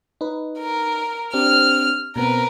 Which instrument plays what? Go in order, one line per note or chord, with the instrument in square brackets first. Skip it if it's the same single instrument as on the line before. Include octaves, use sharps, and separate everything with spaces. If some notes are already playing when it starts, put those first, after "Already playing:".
[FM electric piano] D#4 B4
[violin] A#4
[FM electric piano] C4 D4 G4 [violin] F6
[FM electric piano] B2 B3 C4 [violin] A#4 B4